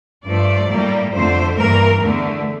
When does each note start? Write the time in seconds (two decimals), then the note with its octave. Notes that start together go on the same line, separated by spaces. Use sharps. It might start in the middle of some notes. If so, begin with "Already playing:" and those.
0.25 G2 F3 A3 D5
0.70 A2 G3 A#3
1.13 F2 D3 A3 C5
1.58 G2 E3 A#3 A#4
2.02 E2 D3 A3